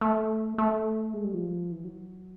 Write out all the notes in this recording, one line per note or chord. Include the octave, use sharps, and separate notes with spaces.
A3
A3
G#3
G3
F3
E3
F#3